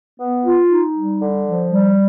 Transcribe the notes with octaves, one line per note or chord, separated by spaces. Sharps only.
B3
F4
D#4
G3
D3
F3
G3